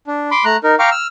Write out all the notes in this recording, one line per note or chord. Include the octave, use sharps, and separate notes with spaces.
D4
B5 C6 D6
A3 A#5 F#6
D#4 A#4
F5 G5 A#5 C#6 D6 F6
E6 F6